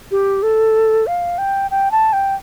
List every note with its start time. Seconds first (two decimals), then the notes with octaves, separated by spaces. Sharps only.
0.11 G4
0.43 A4
1.07 F5
1.38 G5
1.71 G5
1.91 A5
2.13 G5